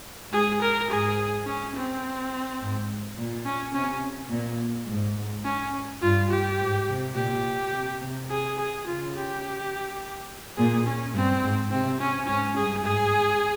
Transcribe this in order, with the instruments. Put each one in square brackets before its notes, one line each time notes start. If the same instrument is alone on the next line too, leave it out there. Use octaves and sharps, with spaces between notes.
[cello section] G#2 [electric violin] G#4
[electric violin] A#4
[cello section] G#2 [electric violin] G#4
[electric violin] C#4
C4
[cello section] G#2
A#2
[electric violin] C#4
[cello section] C3 [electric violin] C#4
[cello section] A#2
G#2
[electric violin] C#4
[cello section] G2 [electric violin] F4
[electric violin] G4
[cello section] G#2
C3
[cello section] A#2 [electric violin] G4
[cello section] C3
C3
[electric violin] G#4
G#4
[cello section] C#3 [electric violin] F4
[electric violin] G4
[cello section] A#2 [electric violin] G#4
[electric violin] C#4
[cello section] G2 [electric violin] C4
[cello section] G#2
[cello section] C3 [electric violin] C4
[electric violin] C#4
[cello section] G#2 [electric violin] C#4
[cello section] G2 [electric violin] G#4
[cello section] G#2 [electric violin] G#4